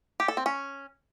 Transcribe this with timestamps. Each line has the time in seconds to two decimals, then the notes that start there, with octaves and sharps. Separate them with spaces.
0.20 G4
0.28 A4
0.37 C4
0.46 C#4